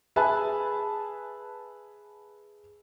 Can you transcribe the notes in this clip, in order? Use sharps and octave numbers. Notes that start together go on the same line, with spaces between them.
G#4 B4 E5 G#5 A5 F#6